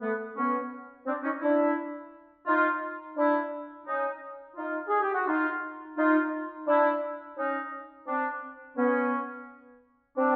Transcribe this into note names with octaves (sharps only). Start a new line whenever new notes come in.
A3 B3
B3 C#4
C4 D4
C#4 D#4
D4 E4
D#4 F4
D4 E4
C#4 D#4
D#4 F4
G#4
G4
F#4
D#4 F4
D#4 F4
D4 E4
C#4 D#4
C4 D4
B3 C#4
C4 D4